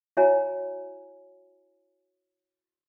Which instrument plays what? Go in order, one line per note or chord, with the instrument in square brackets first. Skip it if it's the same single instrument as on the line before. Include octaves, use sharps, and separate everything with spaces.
[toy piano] E4 F#4 C#5 E5 G#5 A#5